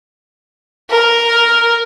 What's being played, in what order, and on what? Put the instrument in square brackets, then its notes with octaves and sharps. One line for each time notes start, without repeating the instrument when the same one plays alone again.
[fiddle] A#4